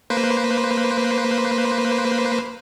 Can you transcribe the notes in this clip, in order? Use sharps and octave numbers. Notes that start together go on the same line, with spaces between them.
A#3 B4 C5